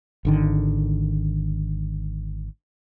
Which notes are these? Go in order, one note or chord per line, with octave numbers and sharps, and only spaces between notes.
G#1 D3 D#3